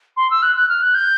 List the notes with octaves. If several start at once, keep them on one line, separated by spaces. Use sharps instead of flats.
C6
E6
F#6
F#6
F6
F#6
G6